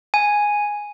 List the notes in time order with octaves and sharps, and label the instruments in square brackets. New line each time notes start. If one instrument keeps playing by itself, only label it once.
[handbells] G#5